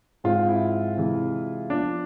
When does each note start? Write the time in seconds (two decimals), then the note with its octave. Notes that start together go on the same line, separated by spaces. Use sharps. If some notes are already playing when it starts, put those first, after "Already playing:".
0.24 G#2 G#3 C4 F4
0.49 E4
0.97 C3 E3 G#3
1.70 F3 B3 D4 F4